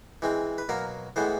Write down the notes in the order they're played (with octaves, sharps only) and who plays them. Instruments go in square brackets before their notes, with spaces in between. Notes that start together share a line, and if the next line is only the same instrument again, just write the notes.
[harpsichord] E3 G#3 C4
B4
B2 F#3 A#3 A#4
A2 E3 G#3 B3 C5